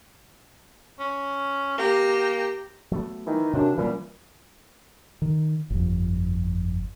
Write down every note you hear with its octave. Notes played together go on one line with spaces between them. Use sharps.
C#4
A#3 G4 A#5
F#3 A3 B3
D#3 E3 D#4
F#2 C3 D4
A#2 E3 F#3 G3 C#4
D#3
G1 F2